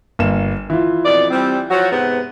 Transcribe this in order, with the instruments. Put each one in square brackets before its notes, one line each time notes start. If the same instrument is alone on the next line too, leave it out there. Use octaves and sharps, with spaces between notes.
[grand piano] G1 A#3 E7
E3 F4
[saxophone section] F2 B2 D5
G3 C4
F3 F#3 F#4
G#2 C3 B3